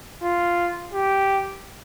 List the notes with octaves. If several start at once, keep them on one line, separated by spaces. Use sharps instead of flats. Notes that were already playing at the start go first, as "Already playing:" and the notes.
F4
G4